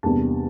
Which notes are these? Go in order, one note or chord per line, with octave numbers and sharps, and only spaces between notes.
E2 C3 G3 A#3 D4 A5